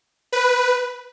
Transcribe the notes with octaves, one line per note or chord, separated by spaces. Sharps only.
B4